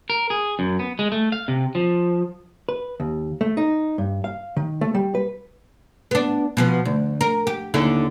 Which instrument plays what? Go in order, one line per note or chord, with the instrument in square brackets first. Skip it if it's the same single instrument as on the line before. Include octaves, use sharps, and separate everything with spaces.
[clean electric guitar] A#4
G#4
F#2
B3
G#3
A3
F5
C3
F3
[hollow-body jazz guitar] B4
D#2
A3
D#4
G2
F5
D#3
A3
G3
B4
[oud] B3 D4
B2 F3 B3
D2
A#4
G4
D#2 D3 E4